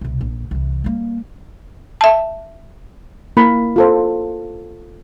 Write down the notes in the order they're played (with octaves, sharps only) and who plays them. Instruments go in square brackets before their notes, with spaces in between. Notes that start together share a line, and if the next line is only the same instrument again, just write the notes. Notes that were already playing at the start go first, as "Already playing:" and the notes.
[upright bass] C2 B2
A#1
C2 E3
G3 A#3
[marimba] E5 A5
[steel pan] A#3 E4 A#4 B5
F4 A4 C5